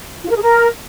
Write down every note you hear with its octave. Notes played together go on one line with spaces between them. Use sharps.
F4
A#4
G#4
A#4